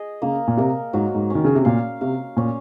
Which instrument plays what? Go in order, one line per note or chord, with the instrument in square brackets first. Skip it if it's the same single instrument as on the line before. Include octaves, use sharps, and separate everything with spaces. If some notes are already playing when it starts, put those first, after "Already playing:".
Already playing: [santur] G#4 D#5
[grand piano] C#3 [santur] A#3
[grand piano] A#2
[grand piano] C3 [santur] A#4
[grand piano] G#2 [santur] F#3
[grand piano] G#2
[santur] C#4
[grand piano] D#3
C#3
C3
[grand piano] A#2 [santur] F5
[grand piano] C3 [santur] F5
[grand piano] A#2 [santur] C#4